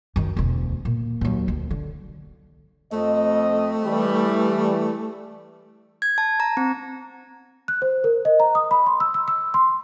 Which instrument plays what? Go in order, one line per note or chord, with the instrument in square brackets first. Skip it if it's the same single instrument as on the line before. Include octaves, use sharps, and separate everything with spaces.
[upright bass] F#2 D#3
E1 D2
A#2
D#2 F#3
D2
D3
[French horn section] F2 D#5 [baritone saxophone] A3
[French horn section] E3 G3
[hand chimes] G#6
A5
A#5
C4
[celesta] F#6
C5
A#4
D#5
A#5
D#6
B5
C6
E6
E6
E6
C6